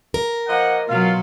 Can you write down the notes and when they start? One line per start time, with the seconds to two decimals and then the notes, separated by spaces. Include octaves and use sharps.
0.14 A#4
0.48 F3 A#3 D#5 F#5
0.88 B2 F#3 F4 F5